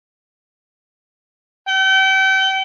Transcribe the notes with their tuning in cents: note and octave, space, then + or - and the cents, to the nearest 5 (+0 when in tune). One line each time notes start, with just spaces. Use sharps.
G5 -35